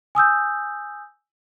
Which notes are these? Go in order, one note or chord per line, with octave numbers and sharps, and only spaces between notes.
G#5 D#6 E6 G6